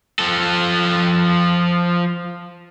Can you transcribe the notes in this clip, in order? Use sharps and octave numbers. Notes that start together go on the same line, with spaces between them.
F3 A4